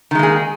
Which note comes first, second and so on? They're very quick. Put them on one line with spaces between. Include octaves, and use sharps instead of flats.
D#3 G#3 A#3 G#4